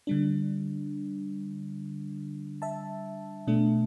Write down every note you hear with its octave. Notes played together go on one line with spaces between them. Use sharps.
D3 G3 D4
E5 A5
B2 A3 D4